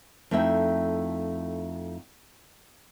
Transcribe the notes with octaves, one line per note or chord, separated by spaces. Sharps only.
F2 A3 D#4 E4 E5 G5